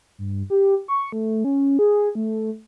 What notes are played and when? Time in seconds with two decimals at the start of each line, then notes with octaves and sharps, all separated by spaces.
0.18 G2
0.50 G4
0.88 C#6
1.12 A3
1.44 C#4
1.79 G#4
2.15 A3